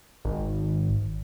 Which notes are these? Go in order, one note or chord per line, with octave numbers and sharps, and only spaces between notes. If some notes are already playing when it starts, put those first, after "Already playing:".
G#1